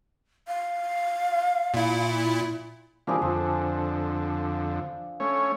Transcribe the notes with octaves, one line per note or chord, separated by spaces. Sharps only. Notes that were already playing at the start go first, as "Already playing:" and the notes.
F5
A#2 E4
E3 F3 G3 A#3 D4 G#4
F2 D3 F3 A4
A3 C#4 C#5